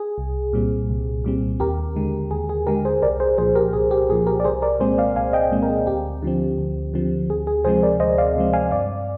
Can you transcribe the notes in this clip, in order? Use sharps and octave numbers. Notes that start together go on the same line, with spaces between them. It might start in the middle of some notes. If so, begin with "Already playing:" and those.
Already playing: G#4
C2
A#2 G3 C4
C2
A#2 G3 C4
D#2 G4 A#4
D3 G#3
D#2 G#4
G#4
D3 G#3 G4 A#4
G#4 C5
C2 A#4 D5
G#4 C5
A#2 F3 G#4 C5
G4 A#4
C2 G#4
G4
A#2 F3 G#4
G4 A#4
D5
C2 G#4 C5
A#4 D5
A#2 G#3 C4 G#4 C5
D5 F5
C2 F5 G#5
D#5 G5
A#2 G#3 C4
A#4
G#4
D2 G4
D3 F3 C4
D2
D3 F3 C4
D2 G#4
G#4
C3 F3 G#3 C4 G#4 C5
A#4 D5
D2 C5 D#5
D5 F5
C3 F3 G#3 C4
F5 G#5
G2 D5 F5